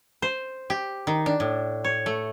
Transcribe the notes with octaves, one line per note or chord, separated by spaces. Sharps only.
C5
G4
D#3
D4
A2
C#5
A3